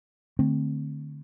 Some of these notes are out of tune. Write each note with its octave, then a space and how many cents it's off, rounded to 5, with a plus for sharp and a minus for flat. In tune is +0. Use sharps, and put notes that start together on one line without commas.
D3 +20 A3 +0 C4 +0